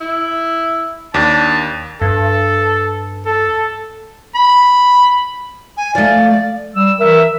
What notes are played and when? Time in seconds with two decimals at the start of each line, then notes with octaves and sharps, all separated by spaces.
0.01 E4
1.14 D#2 D4 A5
2.02 G2 A4
3.26 A4
4.35 B5
5.77 G#5
5.95 F3 A3 D5
6.30 D5
6.76 G3 E6
7.00 E3 A#4 E5 E6